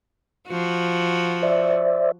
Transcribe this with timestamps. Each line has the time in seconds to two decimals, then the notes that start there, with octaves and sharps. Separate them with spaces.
0.49 F3 F#4
1.43 C5 D5 E5